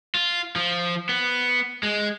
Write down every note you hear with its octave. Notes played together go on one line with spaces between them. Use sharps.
F4
F3
B3
G#3